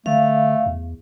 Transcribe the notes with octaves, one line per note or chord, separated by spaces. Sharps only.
D3 A3 F5
E2